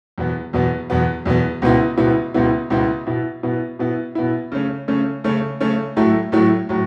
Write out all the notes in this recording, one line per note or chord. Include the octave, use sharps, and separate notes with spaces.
E2 B2 B3
E2 B2 B3
E2 B2 B3
E2 B2 B3
C#2 B2 B3 E4
C#2 B2 B3 E4
C#2 B2 B3 E4
C#2 B2 B3 E4
B2 B3 E4
B2 B3 E4
B2 B3 E4
B2 B3 E4
C#3 A3 C#4
C#3 A3 C#4
C#3 A3 C#4
C#3 A3 C#4
A2 F#3 A3 E4
A2 F#3 A3 E4
A2 F#3